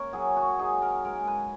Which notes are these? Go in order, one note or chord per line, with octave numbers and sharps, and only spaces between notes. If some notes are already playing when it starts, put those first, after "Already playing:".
Already playing: A#3 C#4 A#4 C#5
F#3 G#4
F#4
D#4 G#4
A#4
G#3 A#4
B4